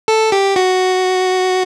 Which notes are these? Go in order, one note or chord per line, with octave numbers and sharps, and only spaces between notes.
A4
G4
F#4